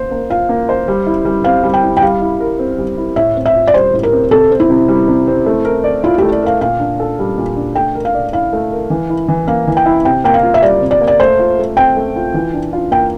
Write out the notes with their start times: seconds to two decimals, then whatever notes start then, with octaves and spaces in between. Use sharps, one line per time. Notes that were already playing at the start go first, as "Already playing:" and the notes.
Already playing: A#3 C5
0.11 A#3
0.30 F4 F5
0.49 A#3
0.69 C5
0.88 G3
1.07 E4
1.25 G3
1.44 C4 F5
1.63 G3
1.74 G5
1.83 E4
1.97 G5
2.02 G3 F5
2.21 E4
2.40 A#4
2.59 C4
2.78 G3
2.98 E4
3.16 A2 E5
3.36 C4
3.46 E5
3.55 F4
3.67 D5
3.74 G3 C5
3.93 A2
4.03 A#4
4.12 C4
4.31 C3 A4
4.51 C4
4.60 E4
4.70 C3
4.88 G3
5.08 C3
5.27 C4
5.46 A3
5.65 A#4
5.84 D5
6.03 E4 F4
6.18 A3 G4
6.32 D5
6.42 A#4 F5
6.61 A#2 F5
6.79 D4
7.00 A4
7.19 G3
7.38 A#2
7.56 D4
7.75 A3 G5
7.95 A#4
8.05 F5
8.14 D5
8.33 E4 F5
8.53 A3
8.72 A#4
8.90 E3
9.10 E4
9.28 E3
9.47 A#3 F5
9.67 E3
9.77 G5
9.86 E4
10.05 C3 G5
10.24 A#3 G5
10.34 F5
10.43 F4
10.54 E5
10.62 G3 D5
10.81 C3
10.91 D5
11.01 A#3
11.08 D5
11.19 A3 C5
11.39 F4
11.59 A3
11.77 C4 G5
11.96 A3
12.16 F4
12.34 E3
12.53 D4
12.73 F4
12.91 A#3 G5